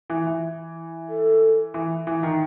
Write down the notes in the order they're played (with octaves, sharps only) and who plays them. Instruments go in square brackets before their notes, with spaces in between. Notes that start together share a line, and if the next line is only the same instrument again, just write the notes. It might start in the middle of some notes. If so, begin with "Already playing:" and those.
[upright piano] E3
E3
[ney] A4
[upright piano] E3
E3
D#3